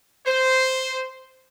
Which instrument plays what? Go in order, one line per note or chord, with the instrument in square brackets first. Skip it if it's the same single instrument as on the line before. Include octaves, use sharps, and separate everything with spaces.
[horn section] C5